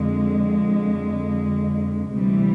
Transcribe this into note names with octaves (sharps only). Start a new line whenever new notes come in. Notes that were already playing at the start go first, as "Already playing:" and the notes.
Already playing: F2 D3 G#3
D2 C3 E3 G3